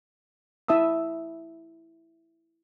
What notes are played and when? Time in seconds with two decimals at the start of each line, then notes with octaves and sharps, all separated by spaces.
0.68 E4 E5 A5 D#6 E6